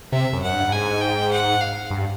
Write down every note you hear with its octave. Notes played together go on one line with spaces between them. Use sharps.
C3 E5
F#2
F#2 F#5
G2
G2
G#2 G#5
G5
F#5
F5
G2